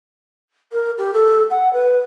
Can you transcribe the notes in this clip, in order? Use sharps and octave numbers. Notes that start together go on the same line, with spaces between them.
A#4
G4
A4
F#5
B4